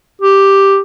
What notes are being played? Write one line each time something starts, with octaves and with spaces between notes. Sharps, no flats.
G4